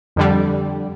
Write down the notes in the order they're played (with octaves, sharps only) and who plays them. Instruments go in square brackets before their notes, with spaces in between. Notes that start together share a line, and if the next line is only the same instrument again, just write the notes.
[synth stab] F2 D3 G3